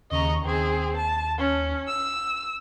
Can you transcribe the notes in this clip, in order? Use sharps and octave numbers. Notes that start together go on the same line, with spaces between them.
D#2 C#3 D#5 A#5 C#6
D#2 C4 G#4
A5
C#4
E6